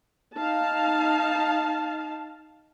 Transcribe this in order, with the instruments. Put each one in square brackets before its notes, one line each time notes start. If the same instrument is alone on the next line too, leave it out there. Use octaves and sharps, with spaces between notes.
[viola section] D#4 F5 A5